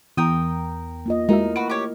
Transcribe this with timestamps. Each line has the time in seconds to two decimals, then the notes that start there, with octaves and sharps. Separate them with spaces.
0.17 E2 A#4 G5 D#6
1.06 A#3 F4 D#5
1.29 G#3 A3 D#4 E4 F#4 A#4 E5
1.56 F#4 B4 D7
1.70 G4 C#5